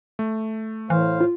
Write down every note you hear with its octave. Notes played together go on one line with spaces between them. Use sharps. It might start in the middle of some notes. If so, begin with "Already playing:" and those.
A3
A2 E3 C5 F5
F4